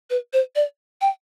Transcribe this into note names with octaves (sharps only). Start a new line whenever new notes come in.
B4
C5
D5
G5